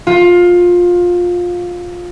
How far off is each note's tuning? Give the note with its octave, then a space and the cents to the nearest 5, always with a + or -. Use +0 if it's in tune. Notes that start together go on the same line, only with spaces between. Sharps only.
F4 +20